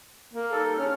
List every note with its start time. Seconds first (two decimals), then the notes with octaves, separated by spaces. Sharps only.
0.33 A#3
0.52 G3 D#4 A4
0.79 C#3 C#4 D4 F6